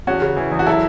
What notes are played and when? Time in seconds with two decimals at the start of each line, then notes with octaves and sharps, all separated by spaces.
0.07 E2 C#4 F#4
0.22 C#3
0.37 E3
0.51 E2
0.59 F#4
0.67 F#3 E4 A4